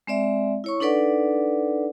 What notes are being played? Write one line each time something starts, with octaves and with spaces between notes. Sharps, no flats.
G#3 C4 D5 E5
E4 C#5 C#6
D4 D#4 A4 B4 D5 F#5